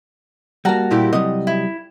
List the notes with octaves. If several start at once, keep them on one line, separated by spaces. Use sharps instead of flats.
G3 A#3 F#4 A5 A#5
A#2 E4 G4
C3 F#3 G3 D#5
E4